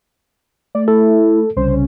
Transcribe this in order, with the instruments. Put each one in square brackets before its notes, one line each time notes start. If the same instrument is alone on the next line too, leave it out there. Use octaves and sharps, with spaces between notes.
[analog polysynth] A3 [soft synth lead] D5
[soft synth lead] E4 [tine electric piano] A4
[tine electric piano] C2 [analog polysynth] C#3 C#4 [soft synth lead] C5